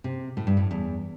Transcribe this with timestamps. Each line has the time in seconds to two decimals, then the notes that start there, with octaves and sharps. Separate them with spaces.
0.04 C3
0.37 A2
0.47 G2
0.57 A2
0.71 E2